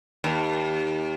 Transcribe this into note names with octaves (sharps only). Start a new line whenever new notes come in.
D#2